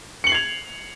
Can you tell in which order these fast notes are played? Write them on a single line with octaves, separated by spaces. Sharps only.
C#7 F#7 C7 G#6 F7